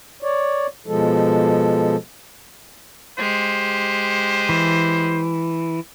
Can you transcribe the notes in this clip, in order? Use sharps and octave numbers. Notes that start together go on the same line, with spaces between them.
C#5 D5
B2 F3 G#3 A4
G#3 G4 C5
E3